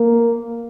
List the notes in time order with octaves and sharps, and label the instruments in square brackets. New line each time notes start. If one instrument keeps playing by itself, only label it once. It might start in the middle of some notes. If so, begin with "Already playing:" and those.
Already playing: [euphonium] A#3